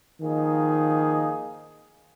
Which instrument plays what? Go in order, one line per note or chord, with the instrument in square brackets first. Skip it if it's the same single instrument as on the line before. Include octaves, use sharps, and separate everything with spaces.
[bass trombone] D#3 [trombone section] F3 A#3 D#4 G#4